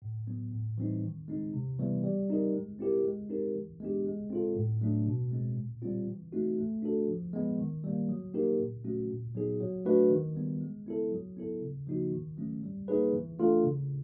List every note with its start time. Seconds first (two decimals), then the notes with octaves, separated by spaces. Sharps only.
0.02 A2
0.27 F#3 B3
0.52 A2
0.78 E3 G3 C4 D#4
1.03 D#3
1.28 G#3 C4 D#4
1.53 C3
1.79 E3 G3 B3
2.03 G3
2.29 C4 D#4 G4 A#4
2.54 G#3
2.79 C4 E4 G4 A#4
3.04 G#3
3.29 C4 D#4 G4 A#4
3.55 E3
3.80 G#3 B3 D4 G4
4.06 G#3
4.30 C4 F4 A4
4.56 A2
4.81 F#3 A3 D4
5.07 B2
5.31 G#3 C4
5.56 A#2
5.82 G3 C4 F4
6.08 E3
6.32 A3 C4 D#4 F#4
6.58 A3
6.82 D4 F#4 A4
7.08 F3
7.33 G#3 B3
7.58 D#3
7.84 G3 A#3
8.09 F#3
8.34 A#3 D#4 G4 A#4
8.60 A#2
8.84 F#3 A3 C#4 F#4
9.10 A#2
9.35 F#3 B3 D#4 G#4
9.60 F#3
9.85 A3 D4 F#4 B4
10.10 D#3
10.35 G3 B3
10.61 G#3
10.86 B3 E4 A4
11.12 F#3
11.37 B3 E4 A4
11.62 C#3
11.87 F3 A#3 D#4 F#4
12.12 D#3
12.37 F#3 A3 C#4
12.63 G3
12.88 A#3 D#4 G#4 B4
13.13 E3
13.39 A3 D4 F4 A4
13.64 C#3